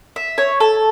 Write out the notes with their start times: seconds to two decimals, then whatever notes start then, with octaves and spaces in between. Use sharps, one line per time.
0.16 E5
0.38 C#5
0.60 A4